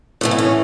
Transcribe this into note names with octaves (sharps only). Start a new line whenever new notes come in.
A2 E3 A3
B3
C#4